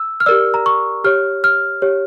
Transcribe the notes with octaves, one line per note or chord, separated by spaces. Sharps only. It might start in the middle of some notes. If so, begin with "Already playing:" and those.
Already playing: E6
F6
G4 A#4 D5 E6
A#5
C#6
G4 C#5 F6
F6
G4 C#5